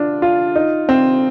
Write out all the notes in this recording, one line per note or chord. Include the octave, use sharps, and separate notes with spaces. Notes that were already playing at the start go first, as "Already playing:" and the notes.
Already playing: D4 F4
F4
D#4
C4